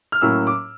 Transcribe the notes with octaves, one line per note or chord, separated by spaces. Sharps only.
F6
A2 F#3 A#3 C#4 E4 E6
D6